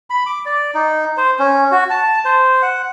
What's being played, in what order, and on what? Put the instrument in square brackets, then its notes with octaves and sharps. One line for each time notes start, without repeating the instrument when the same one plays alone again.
[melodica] B5
D6
D5
D#4
C5
C#4
F#4
A5
C5
F#5